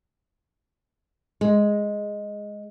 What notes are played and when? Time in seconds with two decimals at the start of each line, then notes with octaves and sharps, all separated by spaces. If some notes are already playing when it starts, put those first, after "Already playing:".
1.41 G#3